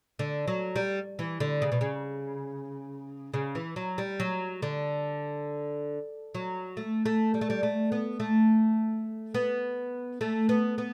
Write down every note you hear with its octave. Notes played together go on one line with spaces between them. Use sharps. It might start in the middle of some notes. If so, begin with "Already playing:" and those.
D3
F#3
G3
E3
D3
C#3
B2
C#3
C#3
E3
F#3
G3
F#3
D3
F#3
A3
A3
G3
A3
G3
A3
B3
A3
B3
A3
B3
B3